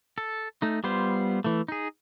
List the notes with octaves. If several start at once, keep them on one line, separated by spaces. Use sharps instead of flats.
A4
A3 D#4
G3 B3 F4 C5
E3 A3
D#4 G#4